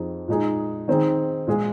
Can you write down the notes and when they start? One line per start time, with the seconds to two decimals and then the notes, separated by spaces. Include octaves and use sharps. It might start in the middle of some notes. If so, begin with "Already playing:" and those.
Already playing: F2 F3 C4 D#4 G#4
0.28 A#2 G#3 D#4 G#4
0.88 D#3 C4 D#4 G#4
1.47 A#2 G#3 F4 G#4